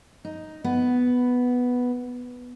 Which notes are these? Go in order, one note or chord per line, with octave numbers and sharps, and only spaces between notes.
D#4
B3